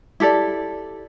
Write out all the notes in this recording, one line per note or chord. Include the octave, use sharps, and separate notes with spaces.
E4 G4 A4 D5